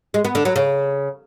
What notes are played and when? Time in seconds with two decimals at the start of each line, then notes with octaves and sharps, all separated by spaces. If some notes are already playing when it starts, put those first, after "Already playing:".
0.14 G#3
0.25 B3
0.35 D3
0.45 F#3
0.56 C#3